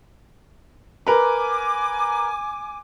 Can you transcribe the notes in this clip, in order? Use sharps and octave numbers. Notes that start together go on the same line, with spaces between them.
A#4 B4 G#5 D6